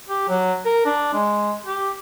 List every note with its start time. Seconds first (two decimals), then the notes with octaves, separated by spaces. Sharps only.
0.09 G4
0.28 F#3
0.65 A#4
0.85 D4
1.13 G#3
1.65 G4